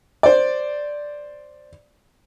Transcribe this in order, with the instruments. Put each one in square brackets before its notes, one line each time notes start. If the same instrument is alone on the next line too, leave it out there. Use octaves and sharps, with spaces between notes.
[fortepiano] C5 D5